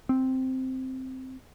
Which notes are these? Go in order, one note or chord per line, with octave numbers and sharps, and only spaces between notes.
C4